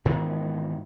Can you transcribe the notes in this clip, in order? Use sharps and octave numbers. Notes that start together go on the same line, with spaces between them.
G#2 D#3 E3 B3